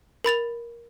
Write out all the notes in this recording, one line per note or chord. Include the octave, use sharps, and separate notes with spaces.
A#4 B5 A6 F7